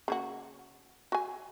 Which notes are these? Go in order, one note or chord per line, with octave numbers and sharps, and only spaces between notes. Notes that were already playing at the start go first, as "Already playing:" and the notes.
C#3 A#3 F#4
F#4 G#5